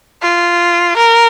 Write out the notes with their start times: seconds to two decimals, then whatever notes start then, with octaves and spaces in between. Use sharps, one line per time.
0.23 F4
0.97 A#4